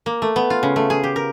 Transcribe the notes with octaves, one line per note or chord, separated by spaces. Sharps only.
A#3
A3
B3
F4
C#3
A3
G#4
G4
A#4